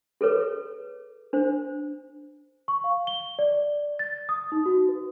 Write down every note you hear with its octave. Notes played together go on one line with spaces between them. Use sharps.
G#4 A4 B4 C#5
D4 C5
C#6
F5
G7
D5
A6
D#6
D#4
F#4
B4